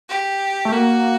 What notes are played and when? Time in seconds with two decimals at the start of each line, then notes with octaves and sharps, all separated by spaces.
0.09 G4
0.65 A3
0.72 A#3 F#4